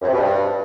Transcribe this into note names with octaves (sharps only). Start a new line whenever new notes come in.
F#2
C3
B2
G2